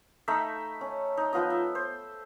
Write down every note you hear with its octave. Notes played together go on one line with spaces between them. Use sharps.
A3 D#4 E5 B5
C#4
D#4
F3 B3 F4 D#5
E5
C5